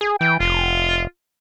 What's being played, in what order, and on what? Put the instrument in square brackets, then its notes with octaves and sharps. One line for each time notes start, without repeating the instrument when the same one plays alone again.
[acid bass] G#4
[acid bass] E3 [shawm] G5
[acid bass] F1 [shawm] F4